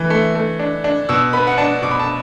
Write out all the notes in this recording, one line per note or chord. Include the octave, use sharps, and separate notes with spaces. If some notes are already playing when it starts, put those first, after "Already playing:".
Already playing: E3 A3
A3
A3
D4
D4
B2 E6
B3 B5
F#5
D4 A5
B2 D6
B5
A5